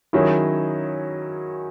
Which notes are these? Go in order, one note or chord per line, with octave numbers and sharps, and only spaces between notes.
D#3 F#3 C#4 E4 G#4